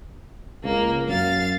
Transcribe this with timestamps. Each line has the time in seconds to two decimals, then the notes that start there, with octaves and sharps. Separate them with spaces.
0.64 C#2 A#3
1.09 F#2 F5 A6